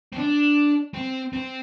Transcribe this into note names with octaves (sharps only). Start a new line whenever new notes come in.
C4
D4
C4
C4